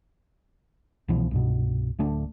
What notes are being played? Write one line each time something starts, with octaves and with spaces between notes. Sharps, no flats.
C2 B2 E3 F3
C2 G2 B2
D1 D3 A3 D4